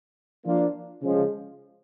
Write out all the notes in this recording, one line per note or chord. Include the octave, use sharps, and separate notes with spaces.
F3 A#3 D4 F4
C#3 F3 G#3